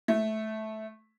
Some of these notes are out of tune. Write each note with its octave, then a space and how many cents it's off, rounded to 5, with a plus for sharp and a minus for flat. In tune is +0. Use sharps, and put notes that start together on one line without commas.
A3 -15